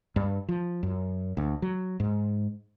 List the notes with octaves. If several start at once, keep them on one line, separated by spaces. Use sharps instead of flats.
G2
F3
F#2
D2
F#3
G#2